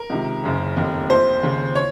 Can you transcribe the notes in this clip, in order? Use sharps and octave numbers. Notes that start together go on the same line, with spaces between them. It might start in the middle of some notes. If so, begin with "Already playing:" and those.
Already playing: A#4
C#2 C3 D#3
F#1 F#2 C#3
F1 D#2 D#3
A#1 A#2 C5
D#2 C#3
C#5